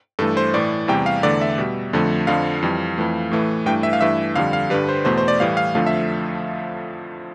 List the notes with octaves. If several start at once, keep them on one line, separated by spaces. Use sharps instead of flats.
G2 E3 A3 A4
C5
A2 E3 A3 D5
E2 C3 G3 G5
F5
E2 D3 A3 D5
E5
B2 G3
F2 D3 F3 A3
F2 D3 F3 F5
F2 E3 G3
F2 E3 A3
A2 E3 A3
G2 E3 A3 G5
E5
F5
G2 E3 A3 E5
F2 D3 G3 F5
F5
G2 D3 G3 B4
C5
E2 B2 A3 C5
C5
D5
A2 E3 G3 F5
F5
F2 D3 F3 A3 F5
E5